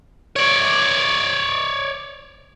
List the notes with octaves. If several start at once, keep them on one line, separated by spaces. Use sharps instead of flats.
C#5 D5